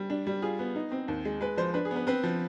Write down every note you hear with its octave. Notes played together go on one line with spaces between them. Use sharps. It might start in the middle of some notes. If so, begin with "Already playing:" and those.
Already playing: G3
D4
G3
F4 G#4
B3
D#4
C4
D#2
G#3
G#3 B4
F3 C5
D4 B4
G#4
B3
B4
C4 B4
F3